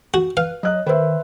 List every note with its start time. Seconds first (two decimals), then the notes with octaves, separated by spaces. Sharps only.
0.14 F#4
0.37 B4 F5
0.63 F#3 D#5 F#6
0.86 D#3 B4 C5 E5